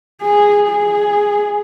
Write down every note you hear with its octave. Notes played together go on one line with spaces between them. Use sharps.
G#4
G#4